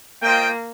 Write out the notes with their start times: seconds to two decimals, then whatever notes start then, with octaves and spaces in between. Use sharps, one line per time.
0.23 A#3 F4 C5 D#5 G5